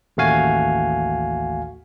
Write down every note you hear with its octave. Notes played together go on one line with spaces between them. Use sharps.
A1 D#2 A3 F#4 F5 G#5